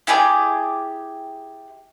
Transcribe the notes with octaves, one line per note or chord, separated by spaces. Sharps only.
E4 G4 G#4 D5